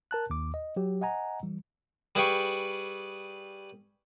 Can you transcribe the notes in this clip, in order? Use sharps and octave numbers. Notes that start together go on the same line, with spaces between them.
A#4 A5 F#6
D#2 D6
D#5
F#3 G4
D#5 F#5 G#5 A#5
E3 G3
G3 G#4 B4 F5 G5 C#6